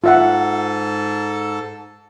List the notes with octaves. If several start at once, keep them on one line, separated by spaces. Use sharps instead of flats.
G#2 F4 A4 E5 F#5